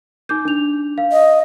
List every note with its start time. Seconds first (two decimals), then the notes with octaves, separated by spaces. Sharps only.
0.29 D#4 D6 G6
0.45 D4 F7
0.98 F5
1.12 D#5